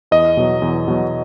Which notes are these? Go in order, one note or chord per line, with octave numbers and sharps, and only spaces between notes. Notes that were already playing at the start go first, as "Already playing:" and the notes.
E2 D#5
B2 F#3
E2
B2 F#3